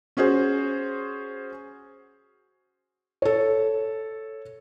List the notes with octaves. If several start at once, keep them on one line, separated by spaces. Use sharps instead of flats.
C#4 F#4 G#4 C5
A4 C#5